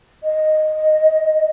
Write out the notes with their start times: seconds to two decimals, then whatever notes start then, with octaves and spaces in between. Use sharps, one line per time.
0.24 D#5